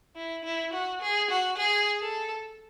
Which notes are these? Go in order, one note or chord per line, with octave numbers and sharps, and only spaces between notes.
E4
E4
F#4
G#4
F#4
G#4
A4